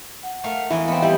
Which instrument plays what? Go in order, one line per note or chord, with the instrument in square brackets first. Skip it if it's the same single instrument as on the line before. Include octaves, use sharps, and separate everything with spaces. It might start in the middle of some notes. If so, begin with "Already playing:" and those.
[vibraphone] F#5
[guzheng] A3 A#4 F5
[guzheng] E2 F#4 D#5 [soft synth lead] E4
[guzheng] B3 C4 [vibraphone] D#5 F5
[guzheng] G3 [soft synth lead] E4 [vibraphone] G4 D#5